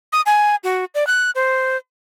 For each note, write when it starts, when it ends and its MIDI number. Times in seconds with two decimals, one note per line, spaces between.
0.13 0.21 87
0.26 0.56 80
0.64 0.85 66
0.95 1.07 74
1.07 1.31 90
1.35 1.77 72